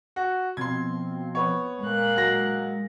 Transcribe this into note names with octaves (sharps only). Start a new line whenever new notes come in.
F#4
B2 F3 C4 C6 G#6
B3 C#5
A#2 G#3 A#3 F#6
F#3 A#6